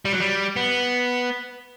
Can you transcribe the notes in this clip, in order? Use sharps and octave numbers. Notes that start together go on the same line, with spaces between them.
G3
F#3
G3
B3